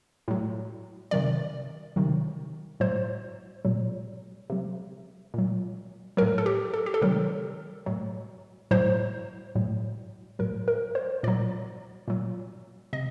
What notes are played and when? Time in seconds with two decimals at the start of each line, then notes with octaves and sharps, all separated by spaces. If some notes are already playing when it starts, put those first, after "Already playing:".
0.28 A2 F#3
1.11 C3 D#3 F#3 D5
1.96 C3 D#3 F#3
2.80 A2 F#3 C5
3.65 A#2 F#3
4.50 C3 F#3
5.34 A#2 F#3
6.17 A2 F#3 A#4
6.38 A4
6.46 G4
6.74 A4
6.86 G4
6.94 A4
7.02 C3 D#3 F#3 A#4
7.86 A2 F#3
8.71 A2 F#3 C5
9.55 A2 F#3
10.39 A2 F#3 A#4
10.68 A#4
10.95 C5
11.23 A#2 F#3 D5
12.08 A#2 F#3
12.93 C3 D#5